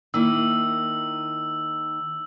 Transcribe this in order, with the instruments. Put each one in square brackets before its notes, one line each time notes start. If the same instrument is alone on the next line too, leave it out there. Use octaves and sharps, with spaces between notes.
[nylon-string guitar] D#3 A#3 E4 [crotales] E6